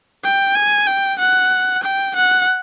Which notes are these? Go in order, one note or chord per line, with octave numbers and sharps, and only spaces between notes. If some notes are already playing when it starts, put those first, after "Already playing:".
G5
G#5
G5
F#5
G5
F#5